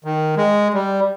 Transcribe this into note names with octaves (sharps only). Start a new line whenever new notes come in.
D#3
G#3
G3